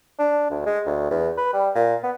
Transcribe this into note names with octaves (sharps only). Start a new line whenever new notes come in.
D4
D2
G#3
D2
E2
B4
G3
A#2
B3